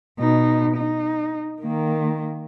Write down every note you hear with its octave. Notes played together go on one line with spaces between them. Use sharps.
B2 D#4
D#4
D#3 A#3